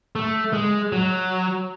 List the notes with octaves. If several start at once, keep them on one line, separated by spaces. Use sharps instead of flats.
A3
G#3
F#3